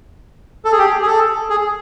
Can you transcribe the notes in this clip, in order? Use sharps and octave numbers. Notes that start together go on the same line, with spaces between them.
A4
G#4
G4
G#4
G#4
A4
G#4